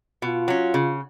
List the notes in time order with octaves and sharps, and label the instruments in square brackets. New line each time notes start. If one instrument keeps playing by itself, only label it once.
[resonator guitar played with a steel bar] B2 [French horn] F4
[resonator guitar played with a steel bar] F#3 C#4
C#3